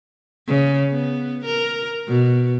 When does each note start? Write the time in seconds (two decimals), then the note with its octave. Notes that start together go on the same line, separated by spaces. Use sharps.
0.48 C#3
0.91 B3
1.45 A#4
2.08 B2